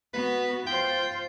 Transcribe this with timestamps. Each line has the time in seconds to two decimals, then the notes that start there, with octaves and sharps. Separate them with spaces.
0.13 B3 F#4 B4
0.66 F4 C5 G5